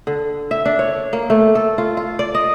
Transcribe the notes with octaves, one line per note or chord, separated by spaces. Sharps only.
D3
E5
D4
C#5
A#3
A3
A4
F4
F4
D5
D#5